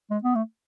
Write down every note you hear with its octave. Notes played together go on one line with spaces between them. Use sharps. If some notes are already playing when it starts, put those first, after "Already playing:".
G#3
B3
A3